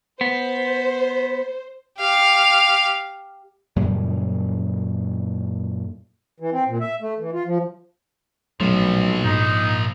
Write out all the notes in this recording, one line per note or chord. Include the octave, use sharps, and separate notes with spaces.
B3 C5
G4 F5
F#2 A#2 C#3 G3
E3
C4
A#2
E5
A3
E3
F4
F3
B1 A#2 F3 F#3 A3
G#2 D#4